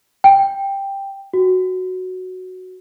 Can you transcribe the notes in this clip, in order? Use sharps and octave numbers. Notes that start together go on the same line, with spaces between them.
G5
F#4